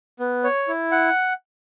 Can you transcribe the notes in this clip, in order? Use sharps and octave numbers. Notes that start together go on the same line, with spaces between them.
B3
C#5
E4
F#5